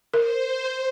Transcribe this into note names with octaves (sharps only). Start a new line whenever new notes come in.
A#4 C5